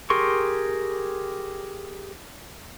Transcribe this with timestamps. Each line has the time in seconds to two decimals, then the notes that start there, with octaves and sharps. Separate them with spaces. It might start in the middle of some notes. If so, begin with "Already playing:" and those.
0.10 G4 G#4 A#4 C6 C#6